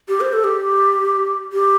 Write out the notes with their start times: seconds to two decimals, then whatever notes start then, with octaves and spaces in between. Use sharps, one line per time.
0.08 G4
0.21 C5
0.33 A4
0.44 G4
1.53 G4